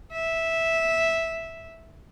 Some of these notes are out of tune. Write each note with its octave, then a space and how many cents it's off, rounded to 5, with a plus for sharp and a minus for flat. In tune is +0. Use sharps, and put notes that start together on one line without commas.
E5 -5